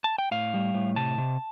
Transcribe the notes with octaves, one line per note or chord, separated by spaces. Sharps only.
A5
G5
A2 F5
G3
A2
C3 A5
C3